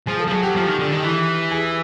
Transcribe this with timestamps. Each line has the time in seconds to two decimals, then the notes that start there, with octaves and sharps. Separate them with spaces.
0.07 F3 G#4
0.20 A4
0.27 F3
0.31 F#3 G#4
0.43 G4
0.55 F3
0.67 D#3
0.79 D3
0.92 D#3
1.03 E3
1.51 G#4